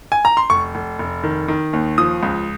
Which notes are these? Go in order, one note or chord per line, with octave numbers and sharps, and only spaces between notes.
G#5
A#5
C6
F1 C#6
F1
F1
D#3
D#3
D#2
F3 D#6
C#2